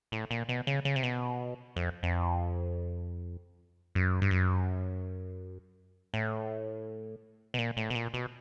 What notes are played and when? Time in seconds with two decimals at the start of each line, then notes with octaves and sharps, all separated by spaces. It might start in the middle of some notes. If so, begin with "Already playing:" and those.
0.12 A2
0.31 A#2
0.49 B2
0.67 C#3
0.85 C#3
0.96 C3
1.03 B2
1.76 F2
2.03 F2
3.95 F#2
4.22 G2
4.31 F#2
6.14 A2
7.54 B2
7.58 A#2
7.77 A2
7.90 B2
7.95 A#2
8.14 B2